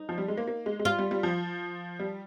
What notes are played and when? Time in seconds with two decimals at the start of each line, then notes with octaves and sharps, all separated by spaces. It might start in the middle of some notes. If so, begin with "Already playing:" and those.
Already playing: D#4
0.09 F3
0.18 G3
0.28 G#3
0.37 A#3
0.48 A#3
0.66 G#3
0.79 G#3
0.85 G3 F4
0.99 G3
1.11 G3
1.23 F3
1.99 G3